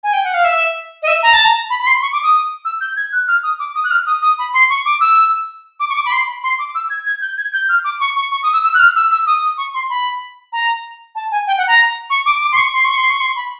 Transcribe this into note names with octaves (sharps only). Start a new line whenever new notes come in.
G#5
G5
F#5
F5
E5
D#5
E5
A#5
A5
A#5
B5
B5
C6
C#6
D6
D#6
E6
G6
G#6
F#6
F6
D#6
D6
D#6
F#6
F6
D#6
D#6
B5
C6
C#6
D6
E6
D6
C#6
D6
B5
C6
B5
C6
D6
E6
G#6
G#6
G6
G#6
G6
F6
D6
C#6
C#6
C#6
D#6
E6
E6
F#6
F6
E6
E6
D#6
D#6
C#6
C6
B5
A#5
A5
G#5
G5
F#5
A#5
C#6
D6
D6
C6
C#6
C6
C#6
C6
C#6
C6
B5